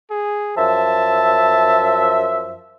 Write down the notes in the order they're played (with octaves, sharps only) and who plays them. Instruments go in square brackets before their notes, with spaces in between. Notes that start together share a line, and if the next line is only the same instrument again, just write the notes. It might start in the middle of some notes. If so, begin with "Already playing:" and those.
[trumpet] G#4
[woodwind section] F#2 F3 E5 [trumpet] A5